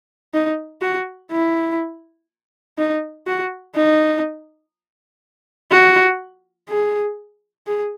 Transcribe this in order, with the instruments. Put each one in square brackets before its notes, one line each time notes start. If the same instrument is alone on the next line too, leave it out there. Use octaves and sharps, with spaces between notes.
[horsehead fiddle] D#4
F#4
E4
D#4
F#4
D#4
F#4
G#4
G#4